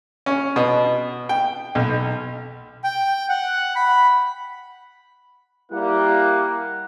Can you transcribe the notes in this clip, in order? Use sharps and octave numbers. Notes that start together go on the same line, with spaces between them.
C#4
B2
G5
B1
G5
F#5
B5
G3 A#3 E4 F#5